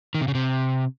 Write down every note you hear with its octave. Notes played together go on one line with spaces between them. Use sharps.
D#3
C3
C#3
C3